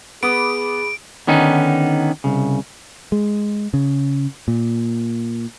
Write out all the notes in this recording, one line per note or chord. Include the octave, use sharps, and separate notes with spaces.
B3 G#4 B5 D6 D#6 D7
D3 D#3 B3 C#4 D#4
C2 C#3
G#3
C#3
A#2